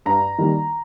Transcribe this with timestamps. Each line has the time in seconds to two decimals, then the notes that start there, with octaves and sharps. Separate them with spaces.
0.06 G2 A#5
0.39 D#3 G3 A#3